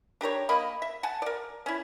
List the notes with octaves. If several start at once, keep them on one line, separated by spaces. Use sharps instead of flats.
D4 G4 A#4 C#5
A#3 D#5 B5
E5
F#5 G#5 A5
A#4 D5
C#4 E4